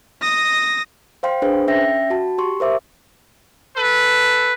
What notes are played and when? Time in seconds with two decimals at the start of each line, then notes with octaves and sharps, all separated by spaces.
0.22 D#6 A#6
1.23 C5 F5 G5 C6
1.42 D4 G#4 B4 C5
1.68 C#4 E5 G5 A#6
2.10 F#4 A5
2.38 G4 C6 C#6
2.60 A#4 C5 E5 D6
3.76 A4 B4